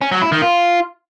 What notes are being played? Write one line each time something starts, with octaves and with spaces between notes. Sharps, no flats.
C#4
F#3
E4
D#3
F4